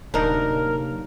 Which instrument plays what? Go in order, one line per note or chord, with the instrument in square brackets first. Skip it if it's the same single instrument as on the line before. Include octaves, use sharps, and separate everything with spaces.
[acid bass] D1 [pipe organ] C3 F#3 A#3 [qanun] D4 D#4 [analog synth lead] A#4